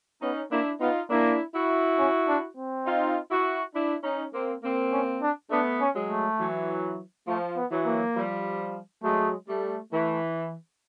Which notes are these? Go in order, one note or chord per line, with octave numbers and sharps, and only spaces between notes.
B3 C#4 D#4
A#3 D4 E4
B3 D#4 F4
A#3 D4 E4
E4 F#4
C#4
D4
C4
D#4 F4
E4 F#4
D4 E4
C#4 D#4
A#3 C4
A#3 C4
C#4
D4
A3 B3 D4
C#4
F#3 G#3
A3
E3 F#3
F3 A3
B3
E3 F#3
A#3
F3 G3
F#3 G#3 A3
G3 A3
E3 A3